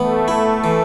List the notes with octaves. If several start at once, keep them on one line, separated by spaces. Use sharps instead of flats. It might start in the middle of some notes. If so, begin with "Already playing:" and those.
Already playing: E3 A3 B3
E4
E3